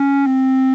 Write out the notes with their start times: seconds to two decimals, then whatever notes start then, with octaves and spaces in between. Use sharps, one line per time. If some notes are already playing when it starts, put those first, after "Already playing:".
Already playing: C#4
0.26 C4